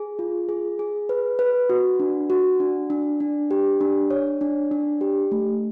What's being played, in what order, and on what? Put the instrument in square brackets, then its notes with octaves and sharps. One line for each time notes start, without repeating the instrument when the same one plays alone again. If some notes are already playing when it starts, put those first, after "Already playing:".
Already playing: [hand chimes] G#4
F4
G#4
G#4
B4
B4
F#4
D4
F#4
D4
D4
D4
G4
D4
C#5
D4
D4
G4
A3